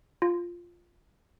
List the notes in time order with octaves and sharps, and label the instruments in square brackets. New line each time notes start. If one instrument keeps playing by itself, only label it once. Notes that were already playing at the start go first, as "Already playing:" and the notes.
[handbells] F4